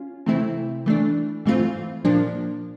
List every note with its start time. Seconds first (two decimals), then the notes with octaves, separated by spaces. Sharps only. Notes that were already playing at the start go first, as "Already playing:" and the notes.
Already playing: C#4 F4
0.26 C3 E3 A3 C4 E4
0.86 E3 A3 D4
1.45 G#2 E3 A3 C4 F4
2.04 A#2 F3 A#3 D4